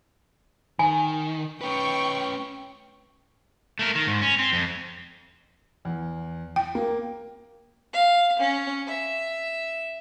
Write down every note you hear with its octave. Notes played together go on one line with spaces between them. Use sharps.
D#3 G#5
C#4 B4 G5 C#6
A3 A#4
D#3
G#2
C#4
C4
F2
E2
G5
A#3
F5
C#4
E5